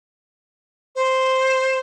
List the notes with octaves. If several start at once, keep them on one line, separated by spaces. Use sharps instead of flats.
C5